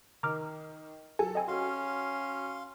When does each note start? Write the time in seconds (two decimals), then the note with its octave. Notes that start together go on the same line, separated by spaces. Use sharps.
0.23 D#3 A#5 D6 F6
1.19 F#3 A4 G#5
1.35 C4 D#5 G#5
1.48 C#4 F#4 F5 C6